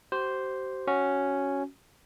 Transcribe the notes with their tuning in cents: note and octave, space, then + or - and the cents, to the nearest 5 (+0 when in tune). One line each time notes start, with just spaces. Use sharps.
G4 -45 C5 +0
C#4 +0 F#4 +0